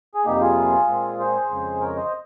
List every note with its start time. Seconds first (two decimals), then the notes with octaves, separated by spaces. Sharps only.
0.14 G#4
0.25 F2 C3 G3 A#3 D#4 G4
0.41 F4 G#4
0.88 A#2 G#3 C4
1.19 G#4 C5
1.50 F2 C#3 G#3
1.80 A#4 C#5
1.96 C5 D#5